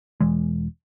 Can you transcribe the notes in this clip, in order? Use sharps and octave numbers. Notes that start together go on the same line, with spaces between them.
E1 E3 G#3